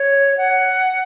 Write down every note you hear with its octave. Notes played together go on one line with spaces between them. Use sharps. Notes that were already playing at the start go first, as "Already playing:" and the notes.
Already playing: C#5
F#5